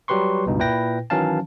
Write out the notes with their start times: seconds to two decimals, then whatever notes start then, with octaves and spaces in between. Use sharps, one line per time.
0.08 F#3 G3 G4 B4 C6 C#6
0.46 C#2 G2 B2 D#4
0.59 A#2 E4 B4 G5 A#6
1.10 D#3 E3 F#3 C#4 F5 A5